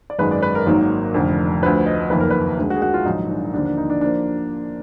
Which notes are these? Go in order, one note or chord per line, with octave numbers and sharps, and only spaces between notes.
D5
G#1 F#2 D#3 G#3 B4
D5
B4
A#4
G#1 G#2 D#3 F#3 A#3
F1 F2 D3
D2 D3 F3 B4
D#5
F#1 F2 D#3 A#3 B4
A#4
B4
D2 D3 G#3
F#4
G#4
F#4
F4
A#1 G#2 D#3 F#3 D#4
D4
D#2 D3 F3 A#3 D4
D4
D#4
D4
F3 A#3 D4